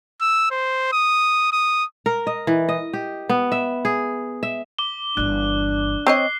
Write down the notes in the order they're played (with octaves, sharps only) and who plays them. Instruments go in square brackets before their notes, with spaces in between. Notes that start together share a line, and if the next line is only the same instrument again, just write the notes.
[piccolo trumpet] E6
C5
D#6
D#6
[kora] A#4
D#5
E3
D#5
G4
B3
E5
G#4
E5
[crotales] D6 G7
[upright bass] G1 E3 [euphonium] D4 [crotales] F#6
[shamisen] C4 C#5 D#5 [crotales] C7